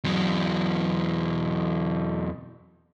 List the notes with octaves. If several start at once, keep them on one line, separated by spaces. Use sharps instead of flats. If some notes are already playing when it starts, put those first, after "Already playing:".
E2 F#3